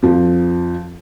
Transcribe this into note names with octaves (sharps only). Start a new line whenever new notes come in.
F2 F3